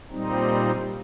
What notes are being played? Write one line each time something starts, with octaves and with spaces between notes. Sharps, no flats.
A#2 G3 C4 D#4